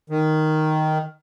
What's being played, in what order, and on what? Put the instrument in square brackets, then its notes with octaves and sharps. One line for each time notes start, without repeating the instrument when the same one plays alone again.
[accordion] D#3